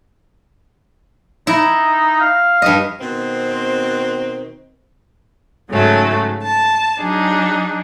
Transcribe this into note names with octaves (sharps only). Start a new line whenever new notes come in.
D#4 E4
F5
G2 D#5
B2 D#3 C4
G#2 C#3 F#3 A3
A5
F#3 D4 D#4 G#4